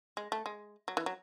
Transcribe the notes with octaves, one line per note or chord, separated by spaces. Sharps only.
G#3
A3
G#3
F#3
E3
F#3